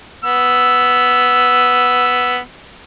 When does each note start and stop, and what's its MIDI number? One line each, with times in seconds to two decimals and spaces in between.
0.24 2.38 59
0.24 2.38 88